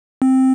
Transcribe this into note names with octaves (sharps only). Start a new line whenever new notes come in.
C4